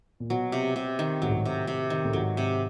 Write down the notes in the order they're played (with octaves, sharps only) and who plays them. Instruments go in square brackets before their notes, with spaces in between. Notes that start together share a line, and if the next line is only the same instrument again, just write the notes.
[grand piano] A#2
[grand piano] B2 [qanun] F#3
[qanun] C3
C3
D#3
[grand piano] A2 [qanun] F#3
[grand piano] G#2
A2
[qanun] C3
C3
D#3
[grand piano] A2
[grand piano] G#2 [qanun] F#3
[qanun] C3